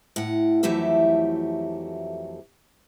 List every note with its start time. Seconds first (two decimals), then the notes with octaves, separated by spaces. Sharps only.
0.16 A2 F#5
0.63 F2 E3 F#3 A3 G4 E5